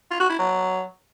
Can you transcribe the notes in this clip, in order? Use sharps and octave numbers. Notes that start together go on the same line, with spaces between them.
F4
F#4
E4
F#3